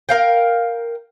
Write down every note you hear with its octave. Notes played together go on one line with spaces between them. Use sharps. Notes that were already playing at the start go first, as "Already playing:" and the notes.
A#4 F5 G5